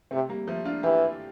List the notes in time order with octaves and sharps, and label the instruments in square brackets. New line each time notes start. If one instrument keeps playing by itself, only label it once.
[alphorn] C3 [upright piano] A3 C4
[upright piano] G3 A#3
F3 A3
D4 F4
[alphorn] E3 [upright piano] E4 G4